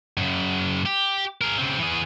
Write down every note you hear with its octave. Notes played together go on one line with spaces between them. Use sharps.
F#2 C#3
G4
G#4 A#4
C#3 C4
E3 G#4